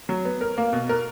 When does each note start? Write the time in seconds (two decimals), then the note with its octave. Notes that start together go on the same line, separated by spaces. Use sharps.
0.09 F#3
0.25 B3
0.41 A#4
0.58 A#3
0.73 B2
0.89 A#4